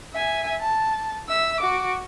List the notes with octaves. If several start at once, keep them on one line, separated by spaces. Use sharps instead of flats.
E5 G#5
A5
E5 E6
F#4 D6